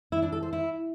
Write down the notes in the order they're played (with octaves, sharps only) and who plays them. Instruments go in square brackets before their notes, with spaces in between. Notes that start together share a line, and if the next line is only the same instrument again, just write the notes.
[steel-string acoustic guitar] E4
D4
A4
C5
E4